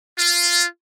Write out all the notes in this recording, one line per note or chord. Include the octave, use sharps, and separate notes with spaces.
F4